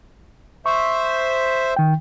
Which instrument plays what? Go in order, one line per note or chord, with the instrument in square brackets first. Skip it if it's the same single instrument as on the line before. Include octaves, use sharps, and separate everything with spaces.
[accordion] C5 E5 [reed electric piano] C#6
[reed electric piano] D#3 G5